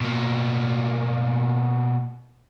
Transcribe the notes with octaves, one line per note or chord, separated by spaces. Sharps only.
B2 A#3